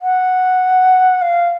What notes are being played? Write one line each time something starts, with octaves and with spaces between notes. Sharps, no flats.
F#5
F5